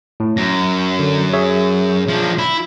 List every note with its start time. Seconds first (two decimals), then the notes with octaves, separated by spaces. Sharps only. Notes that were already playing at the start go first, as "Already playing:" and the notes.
0.20 A2
0.37 F#2 A#6
0.99 D3
1.33 G#4 C#5 E5
2.08 F3 D4
2.39 E4